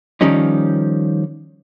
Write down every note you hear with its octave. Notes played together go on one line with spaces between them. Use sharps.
D#3 F3 G3 C#4 D#4